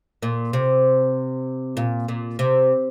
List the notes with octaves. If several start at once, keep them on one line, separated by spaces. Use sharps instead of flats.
A#2
C3
A#2
A#2
C3